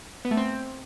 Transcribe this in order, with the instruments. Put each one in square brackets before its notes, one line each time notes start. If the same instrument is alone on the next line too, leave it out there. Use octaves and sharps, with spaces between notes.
[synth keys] B3
A3
C4